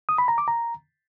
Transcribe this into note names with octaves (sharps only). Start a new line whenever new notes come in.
D#6
B5
A#5
D6
A#5